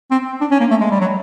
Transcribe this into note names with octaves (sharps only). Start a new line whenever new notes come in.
C4
D4
C#4
A#3
A3
G#3
G3
F#3